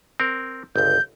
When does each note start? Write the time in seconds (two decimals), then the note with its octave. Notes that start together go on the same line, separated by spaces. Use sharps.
0.20 C4 A#4
0.76 G1 C#2 G6